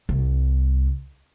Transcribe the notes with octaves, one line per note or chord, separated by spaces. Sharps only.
C2